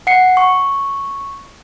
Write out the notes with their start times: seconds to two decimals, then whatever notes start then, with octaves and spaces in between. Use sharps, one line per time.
0.07 F#5 C7 C#7
0.37 C#6